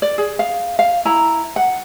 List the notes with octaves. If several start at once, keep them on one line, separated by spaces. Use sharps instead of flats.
D5
G#4
F5
F5
E4 A#5
F#5